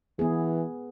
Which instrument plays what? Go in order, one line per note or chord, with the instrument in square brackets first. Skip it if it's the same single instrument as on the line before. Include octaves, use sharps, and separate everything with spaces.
[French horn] E3 [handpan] B3 G#4